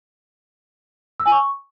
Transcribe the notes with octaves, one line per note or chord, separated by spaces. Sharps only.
E6
G#5
C#6